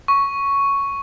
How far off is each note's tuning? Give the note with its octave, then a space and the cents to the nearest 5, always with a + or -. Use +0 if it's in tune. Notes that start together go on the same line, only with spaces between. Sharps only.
C#6 +5